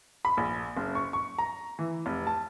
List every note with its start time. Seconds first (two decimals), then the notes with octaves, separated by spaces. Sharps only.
0.25 B5
0.37 A#1
0.77 F#1
0.95 C#6
1.13 C#6
1.38 A#5
1.79 E3
2.06 F1
2.27 A5